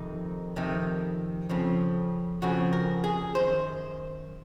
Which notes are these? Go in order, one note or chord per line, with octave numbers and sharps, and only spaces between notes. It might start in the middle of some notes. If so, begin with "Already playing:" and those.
Already playing: F2 C3 D#3 D#4
F2 C3 D#3
F2 C#3 F3
F2 C#3 F3 F#4
A#4
G#4
F#2 D#3 C5